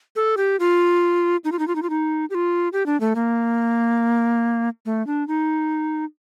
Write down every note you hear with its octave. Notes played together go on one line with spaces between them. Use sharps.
A4
G4
F4
D#4
F4
D#4
F4
D#4
F4
D#4
G4
F4
G4
D4
A3
A#3
A3
D4
D#4